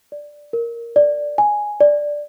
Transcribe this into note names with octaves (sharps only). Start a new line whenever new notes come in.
D5
A#4
D5
G#5
D5